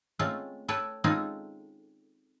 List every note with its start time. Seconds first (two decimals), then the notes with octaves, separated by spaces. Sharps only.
0.19 G#3 A3 C4 C#4 F4
0.68 A4 B4 C#5 G5 A5
1.04 G#3 C4 C#4 D#4 F4 A4